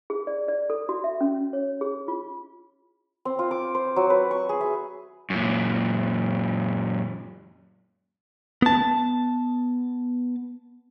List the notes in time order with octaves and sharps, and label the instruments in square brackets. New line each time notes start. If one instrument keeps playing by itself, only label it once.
[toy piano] G#4
D5
D5
A4
F#4
E5
C#4
C#5
G#4
F4
[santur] C4
F4
D6
C5
F#3
B4
C#6
G#4
E5
[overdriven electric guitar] F#2 A#2
[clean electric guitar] B3 A5